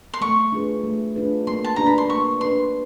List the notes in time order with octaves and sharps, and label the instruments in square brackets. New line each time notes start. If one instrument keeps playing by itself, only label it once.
[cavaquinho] C6
[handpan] A3 [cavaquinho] C#6
[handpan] D4 F4 G#4 B4
A3
D4 F4 G#4 B4
[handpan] A#3 [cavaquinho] C6
[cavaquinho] A5
[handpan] D4 G4 B4 [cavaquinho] A#5
[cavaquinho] B5
C6
[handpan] A#3 [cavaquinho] C#6
[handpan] D4 G4 B4 [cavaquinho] C6